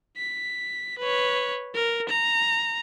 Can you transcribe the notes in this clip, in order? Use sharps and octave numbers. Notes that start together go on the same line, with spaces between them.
B6
B4 C#5
A#4
A#5